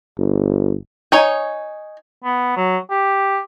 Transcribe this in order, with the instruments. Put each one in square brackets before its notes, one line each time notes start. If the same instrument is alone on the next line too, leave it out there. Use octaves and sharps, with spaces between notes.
[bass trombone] G1
[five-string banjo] D#4 C#5 G#5
[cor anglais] B3
F#3
G4